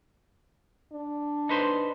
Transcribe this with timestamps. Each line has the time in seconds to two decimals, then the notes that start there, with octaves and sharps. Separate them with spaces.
0.92 D4
1.49 D#4 B4 C5